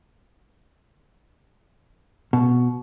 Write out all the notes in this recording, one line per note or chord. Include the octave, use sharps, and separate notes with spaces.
B2